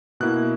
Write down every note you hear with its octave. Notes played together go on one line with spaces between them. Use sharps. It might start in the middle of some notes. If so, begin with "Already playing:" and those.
B2 A#3 E4 F#6